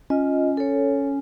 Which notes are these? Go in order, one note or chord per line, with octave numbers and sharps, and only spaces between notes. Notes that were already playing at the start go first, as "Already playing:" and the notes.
C#4 F4 D#5
A4 C#5